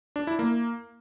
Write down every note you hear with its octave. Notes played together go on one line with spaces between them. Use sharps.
D4
E4
A#3